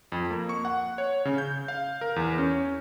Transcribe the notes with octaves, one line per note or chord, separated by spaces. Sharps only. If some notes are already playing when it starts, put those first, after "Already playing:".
F2
A#3
C#6
F#5
C#5
C#3
G6
F5
A#4
E2
C#4